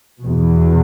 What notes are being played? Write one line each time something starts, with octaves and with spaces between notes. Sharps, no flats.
E2 B2